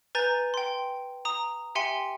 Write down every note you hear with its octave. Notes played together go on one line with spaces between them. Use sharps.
B4 G#5 A#5 G6 A6
G5 C6
A#5 D#6
G4 E5 G5 G#5 C6 C#7